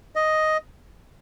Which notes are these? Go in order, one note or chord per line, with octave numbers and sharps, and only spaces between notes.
D#5